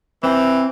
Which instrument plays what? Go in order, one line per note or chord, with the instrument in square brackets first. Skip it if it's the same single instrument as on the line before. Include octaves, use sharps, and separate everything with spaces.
[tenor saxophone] E3 [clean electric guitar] C4